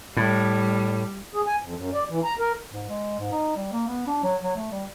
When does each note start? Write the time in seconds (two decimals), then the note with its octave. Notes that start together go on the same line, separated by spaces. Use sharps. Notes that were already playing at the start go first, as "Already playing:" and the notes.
0.17 A2 G3
1.33 G#4
1.46 G#5
1.61 F2
1.75 F#2
1.94 D5
2.09 E3
2.24 A#5
2.39 A#4
2.72 G#2
2.89 G#3
3.19 G#2
3.32 D#4
3.57 G3
3.73 A#3
3.88 B3
4.07 D4
4.23 F#3
4.43 F#3
4.56 A3
4.71 G3